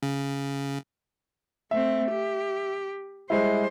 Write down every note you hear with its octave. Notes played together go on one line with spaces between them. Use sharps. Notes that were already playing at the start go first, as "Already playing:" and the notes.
C#3
A3 C4 E5
G4
G3 G#3 E4 C5